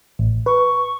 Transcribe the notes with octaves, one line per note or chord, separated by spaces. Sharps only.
A1
B4 C#6